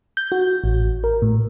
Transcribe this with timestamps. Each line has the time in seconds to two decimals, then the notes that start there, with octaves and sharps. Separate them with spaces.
0.17 G6
0.32 F#4
0.64 A1
1.04 A#4
1.22 A2